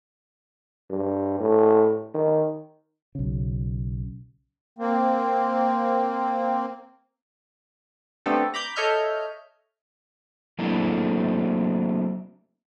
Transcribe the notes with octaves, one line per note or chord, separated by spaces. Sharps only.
G2
A2
D#3
B1 C#3
A#3 C4
A3 B3 C4 D4 G4 A4
A#5 B5 D6 G6
A4 C#5 D#5 E5 F6 G6
F#3 A3 A#3 C4 D4 E4